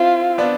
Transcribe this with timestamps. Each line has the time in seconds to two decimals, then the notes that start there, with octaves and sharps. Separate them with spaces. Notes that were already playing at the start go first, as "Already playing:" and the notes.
Already playing: C4 E4 F4
0.38 B3 D4